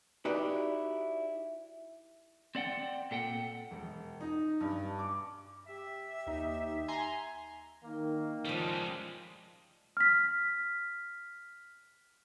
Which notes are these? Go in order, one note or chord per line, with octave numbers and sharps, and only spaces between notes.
D#4 E4 F#4 G4 B4 D5
C4 D5 F#5 G5
A#2 A4 F#5 G5
E1
D#4
G2
D6
G4 E5
D#2 D#4
G#5 A#5 C6
D#3 A#3
C#3 F3 G3 G#3
F6 B6